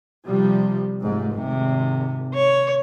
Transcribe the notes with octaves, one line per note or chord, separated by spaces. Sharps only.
C3 F3 G3
F1 G#2
G#1 C3
C#5